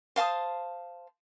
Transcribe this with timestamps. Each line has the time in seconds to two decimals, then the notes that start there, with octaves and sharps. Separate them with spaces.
0.16 C5 F5 A5 D#6